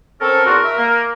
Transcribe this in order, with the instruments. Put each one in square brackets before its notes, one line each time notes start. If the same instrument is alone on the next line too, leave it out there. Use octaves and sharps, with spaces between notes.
[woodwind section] C4 C#4 A4 [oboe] A#4
[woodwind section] E2 F4 F#4
E5
A#3